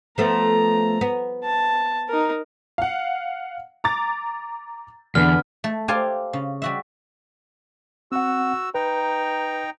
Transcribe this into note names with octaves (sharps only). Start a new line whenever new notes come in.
F3 A3 B3 A#5
B3
A5
D#4 A#4
F5 F#5
A#5 D6 A6
E2 D3 B3 F6
A3
G4 A4 C5 D5 F5 G#5
C#3
G3 F#4 E5
C4 F#4 F#5 E6
D#4 B4 G5 A#5